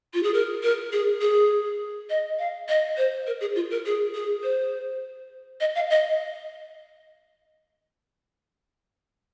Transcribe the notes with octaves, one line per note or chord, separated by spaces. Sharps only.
F4
G#4
A#4
A#4
G#4
G#4
D#5
F5
D#5
C5
A#4
G#4
F4
A#4
G#4
G#4
C5
D#5
F5
D#5